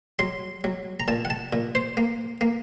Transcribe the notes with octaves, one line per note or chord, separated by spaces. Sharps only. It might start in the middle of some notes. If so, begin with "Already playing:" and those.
F#3 C6
F#3
A#5
A#2 A5
F#5
A5
A#2
C5
A#3
A#3